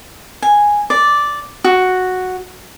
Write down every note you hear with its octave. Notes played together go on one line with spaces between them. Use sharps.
G#5
D5
F#4